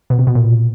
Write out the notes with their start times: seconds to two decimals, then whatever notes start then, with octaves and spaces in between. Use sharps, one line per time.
0.10 B2
0.19 C3
0.27 B2
0.35 A#2